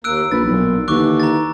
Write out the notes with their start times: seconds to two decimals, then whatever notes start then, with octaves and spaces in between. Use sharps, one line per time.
0.04 D#2 A#3 E6 F#6 D7
0.31 A#1 B4 A6
0.46 B1 A#2
0.88 D#2 D3 E3 C#6 D6 F#6
1.20 A#5 A6